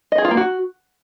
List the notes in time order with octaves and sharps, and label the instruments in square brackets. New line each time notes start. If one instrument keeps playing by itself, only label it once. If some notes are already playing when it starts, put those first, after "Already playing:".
[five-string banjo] D#5
G#4
F4
A#3
F#4